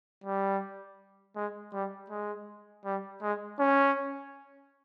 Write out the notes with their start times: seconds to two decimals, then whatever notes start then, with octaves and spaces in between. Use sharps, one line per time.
0.24 G3
1.35 G#3
1.73 G3
2.10 G#3
2.85 G3
3.22 G#3
3.59 C#4